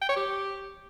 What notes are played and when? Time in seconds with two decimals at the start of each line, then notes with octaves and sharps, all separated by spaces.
0.01 G5
0.09 C#5
0.16 G4